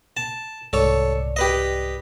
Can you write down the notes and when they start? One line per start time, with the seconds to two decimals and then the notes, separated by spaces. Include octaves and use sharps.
0.17 A5
0.73 C2 G#2 A4 C#5 D5
1.36 G4 B4 D#5